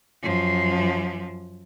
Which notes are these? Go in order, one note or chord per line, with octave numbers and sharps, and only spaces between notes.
F#2 F3